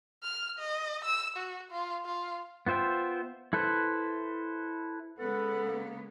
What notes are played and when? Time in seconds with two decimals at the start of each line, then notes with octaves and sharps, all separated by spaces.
0.23 F6
0.59 D#5
1.04 E6
1.36 F#4
1.71 F4
2.05 F4
2.66 B3 F4 C5 E5 G5
3.53 E4 A4 B4 C5
5.19 C#3 G#3 B3 A4 B4 F#5
5.65 A#3